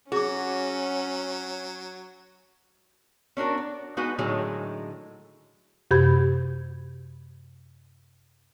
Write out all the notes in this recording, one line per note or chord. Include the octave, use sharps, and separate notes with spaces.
F#3 C#4 F#4 G#4 D6
C#4 D4 F#4 A#4
D5
G#3 B3 D#4 F#4 B4 F#5
A2 D3 D#3 F#3 G#3
F#2 C3 G4 B5 G#6